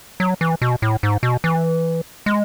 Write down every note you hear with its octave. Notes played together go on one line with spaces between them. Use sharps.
F#3
E3
B2
A2
G#2
B2
E3
G#3